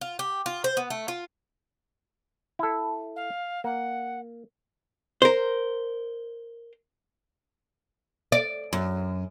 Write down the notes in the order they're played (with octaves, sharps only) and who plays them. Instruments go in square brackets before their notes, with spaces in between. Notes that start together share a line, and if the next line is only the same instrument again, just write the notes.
[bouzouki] F4
G4
F4
C5
B3
A3
F4
[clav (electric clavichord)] E4 A4
[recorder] F5
[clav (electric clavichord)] A#3 [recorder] F#5
[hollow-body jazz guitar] A#4 C5
[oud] D5
F#2